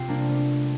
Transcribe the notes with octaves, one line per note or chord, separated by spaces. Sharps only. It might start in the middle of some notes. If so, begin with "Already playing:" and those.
Already playing: C3 C4 F4
G3 A#3 D4
A3 C4